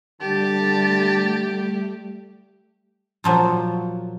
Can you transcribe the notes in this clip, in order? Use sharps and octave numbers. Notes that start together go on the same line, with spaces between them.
D3 G3 A3 G4 A5
A#2 F3 F#3